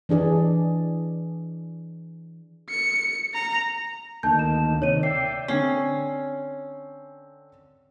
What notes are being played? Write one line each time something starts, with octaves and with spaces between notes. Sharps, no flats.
E3 D4 G#4 D5
C#7
A#5
D2 D#3 A#3 A5 G6
E7
C3 D#3 C#5 D#7
D5 E5 G5 C7
D3 C4 C#4 C7